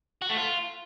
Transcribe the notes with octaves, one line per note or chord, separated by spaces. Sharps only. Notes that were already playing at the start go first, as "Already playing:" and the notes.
F#4
A3
F4